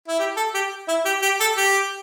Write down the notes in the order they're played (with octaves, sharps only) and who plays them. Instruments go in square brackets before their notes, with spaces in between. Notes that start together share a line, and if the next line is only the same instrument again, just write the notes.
[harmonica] E4
G4
A4
G4
E4
G4
G4
A4
G4